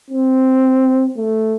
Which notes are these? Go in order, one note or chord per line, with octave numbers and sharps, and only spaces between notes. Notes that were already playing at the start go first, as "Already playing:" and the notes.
C4
A3